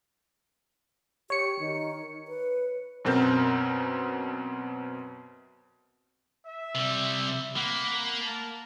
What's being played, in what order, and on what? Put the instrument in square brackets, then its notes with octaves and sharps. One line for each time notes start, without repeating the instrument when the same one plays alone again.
[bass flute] G4 [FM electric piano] C#5 C#7
[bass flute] D#3
B4
[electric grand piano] F#2 B2 C4 A#4 G6
[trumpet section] E5
[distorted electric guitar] C3 G3
[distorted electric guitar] A#3 [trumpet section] C4 F#5 B5
[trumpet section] A#4 A5